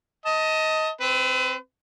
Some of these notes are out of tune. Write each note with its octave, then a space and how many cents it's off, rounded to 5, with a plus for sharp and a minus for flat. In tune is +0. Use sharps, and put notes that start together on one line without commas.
D#5 +20 A5 +20
C4 +0 B4 +35